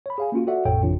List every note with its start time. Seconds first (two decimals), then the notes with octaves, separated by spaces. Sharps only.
0.06 C#5 B5
0.18 G#4 F5 G#5
0.32 A#3 C#4 F4 F#4
0.47 F#4 A4 D5 E5 F#5
0.65 A1 F2 A2 A4 C#5 G5
0.83 G#1 F2 C3 E3 D4 F4